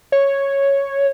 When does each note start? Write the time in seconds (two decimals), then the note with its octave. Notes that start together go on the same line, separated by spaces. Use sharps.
0.12 C#5